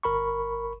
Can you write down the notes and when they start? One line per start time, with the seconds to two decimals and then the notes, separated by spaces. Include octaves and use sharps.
0.03 G1 A#4 B5 C#6